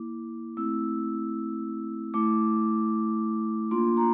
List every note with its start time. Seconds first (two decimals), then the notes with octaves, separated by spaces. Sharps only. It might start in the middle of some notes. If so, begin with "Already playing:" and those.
Already playing: A#3 E4 D6
0.57 A3 C4 E4 E6
2.14 A3 E4 D6
3.71 A#3 D4 F4 C6
3.97 A#5